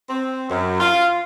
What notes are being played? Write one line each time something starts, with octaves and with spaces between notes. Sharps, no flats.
C4
F#2
F4